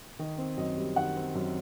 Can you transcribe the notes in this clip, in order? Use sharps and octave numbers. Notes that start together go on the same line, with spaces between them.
D#3 D#5
C4
F#2 D#5
G3
D#3 F#5
C4
F#2